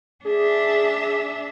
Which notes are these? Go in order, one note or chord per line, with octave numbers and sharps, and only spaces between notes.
D4 G#4 E5